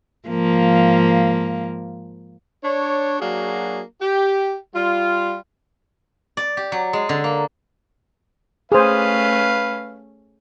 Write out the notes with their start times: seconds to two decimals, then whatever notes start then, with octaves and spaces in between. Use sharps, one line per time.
0.29 G#2 F3 A#3
2.64 D4 C#5
3.20 F#3 A#3 D4 F#4 G#4
4.02 G4
4.74 G3 F4
6.37 D5
6.57 G4
6.72 F#3
6.93 G#3
7.09 D3
7.24 A#3
8.72 A3 C#4 G#4 B4 C5 F5